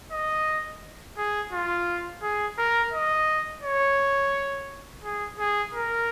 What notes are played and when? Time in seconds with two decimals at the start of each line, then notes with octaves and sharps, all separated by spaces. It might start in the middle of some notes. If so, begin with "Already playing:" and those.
0.12 D#5
1.18 G#4
1.52 F4
2.23 G#4
2.58 A#4
2.93 D#5
3.63 C#5
5.04 G#4
5.39 G#4
5.74 A#4